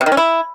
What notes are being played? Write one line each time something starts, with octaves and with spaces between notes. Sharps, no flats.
C3
D#3
C#4
E4